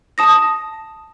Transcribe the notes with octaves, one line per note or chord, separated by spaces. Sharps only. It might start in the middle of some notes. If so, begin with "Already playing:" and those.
A5 D#6 A#6